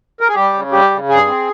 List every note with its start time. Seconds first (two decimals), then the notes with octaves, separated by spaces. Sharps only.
0.21 A#4
0.28 G#4
0.35 G3 G4
0.53 C#3
0.72 G3 G4
0.91 C#3
1.09 G2 G#4
1.26 C4